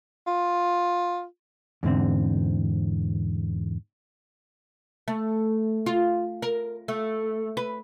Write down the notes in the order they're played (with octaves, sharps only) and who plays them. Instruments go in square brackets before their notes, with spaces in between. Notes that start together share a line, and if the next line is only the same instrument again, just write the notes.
[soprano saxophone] F4
[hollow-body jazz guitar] E2 G#2 D3 C4
[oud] A3
F4
A#4
A3
B4